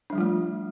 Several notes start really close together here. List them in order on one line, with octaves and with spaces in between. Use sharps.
D4 G3 F3 F4 A3